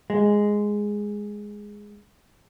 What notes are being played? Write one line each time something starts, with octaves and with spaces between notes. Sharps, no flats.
G#3